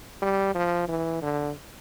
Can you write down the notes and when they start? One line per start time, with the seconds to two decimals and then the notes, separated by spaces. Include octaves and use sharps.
0.22 G3
0.55 F3
0.88 E3
1.22 D3